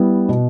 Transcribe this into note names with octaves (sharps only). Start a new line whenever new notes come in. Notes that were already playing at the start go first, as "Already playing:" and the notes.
Already playing: G3 B3 E4
B2